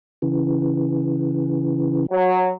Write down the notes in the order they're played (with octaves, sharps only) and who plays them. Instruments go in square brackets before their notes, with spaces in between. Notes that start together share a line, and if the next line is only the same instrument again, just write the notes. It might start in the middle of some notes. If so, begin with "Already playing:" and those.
[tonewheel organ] C#3 E3
[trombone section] F#3